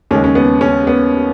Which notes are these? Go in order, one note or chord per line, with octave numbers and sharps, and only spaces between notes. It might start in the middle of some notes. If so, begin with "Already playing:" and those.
D#2 C#3 G#3 C#4
C#4
B3
C#4
B3